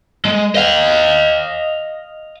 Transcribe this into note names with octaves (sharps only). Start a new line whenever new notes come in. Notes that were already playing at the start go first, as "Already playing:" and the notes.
G#3
D#5 F5